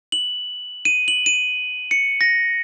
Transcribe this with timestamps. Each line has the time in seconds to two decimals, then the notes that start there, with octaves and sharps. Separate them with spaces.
0.12 F#7
0.85 D#7
1.08 F#7
1.26 D#7
1.91 C#7
2.21 A#6